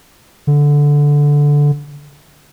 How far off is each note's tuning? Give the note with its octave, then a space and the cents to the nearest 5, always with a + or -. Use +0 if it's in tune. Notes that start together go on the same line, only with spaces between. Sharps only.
D3 -10